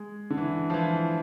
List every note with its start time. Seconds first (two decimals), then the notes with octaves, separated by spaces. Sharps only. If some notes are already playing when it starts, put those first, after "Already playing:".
Already playing: G#3
0.30 D3
0.38 E3
0.70 F3
0.74 E3